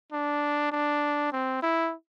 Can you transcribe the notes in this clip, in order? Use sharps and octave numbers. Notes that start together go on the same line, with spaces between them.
D4
D4
C4
E4